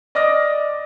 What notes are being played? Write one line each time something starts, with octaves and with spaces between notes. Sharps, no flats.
D5 D#5 D6 F6 A#6